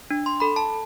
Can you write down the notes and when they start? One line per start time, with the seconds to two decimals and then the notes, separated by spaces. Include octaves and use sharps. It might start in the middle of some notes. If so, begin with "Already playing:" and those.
0.10 D4
0.26 C6
0.40 A4 B5
0.56 A5